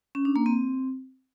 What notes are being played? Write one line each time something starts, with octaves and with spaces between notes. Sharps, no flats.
C#4
D4
A#3
C4